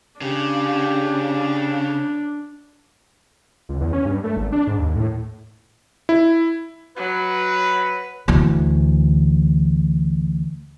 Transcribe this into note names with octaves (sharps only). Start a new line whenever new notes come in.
C#3 D4 G4
C#2
E2
C#4
G2
A3
G#1
D4
G#2
D#2
A2
E4
F#3 B4
D2 E3